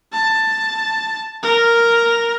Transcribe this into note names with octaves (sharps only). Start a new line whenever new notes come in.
A5
A#4